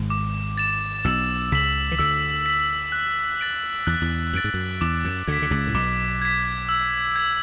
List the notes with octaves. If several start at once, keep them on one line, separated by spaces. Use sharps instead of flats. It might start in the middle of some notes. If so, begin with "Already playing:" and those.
Already playing: G#1 G#2
D6
A6 E7
B1 B2 E6
C#2 C#3 B6 F#7
E3
D2 D3 E6
B6 F#7
F#6
A6 D7 F#7
E2 F#6
E2
F#2 A6 D7 F#7
G#2
F#2
E2 D6
F#2
D2 D3 G#6 B6
D3
C#2 C#3
A2
B1 B2 D6
G#6 B6
E6
G#6 B6 F#7